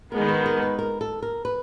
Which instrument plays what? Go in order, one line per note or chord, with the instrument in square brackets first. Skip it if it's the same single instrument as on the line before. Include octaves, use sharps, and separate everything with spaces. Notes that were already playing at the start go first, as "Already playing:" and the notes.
[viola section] D#3 G#3 B3 [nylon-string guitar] A#4
[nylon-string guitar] B4
A#4
B4
A#4
A4
A#4
B4